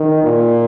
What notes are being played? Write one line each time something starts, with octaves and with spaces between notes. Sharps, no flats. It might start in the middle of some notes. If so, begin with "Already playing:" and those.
Already playing: D#3
A#2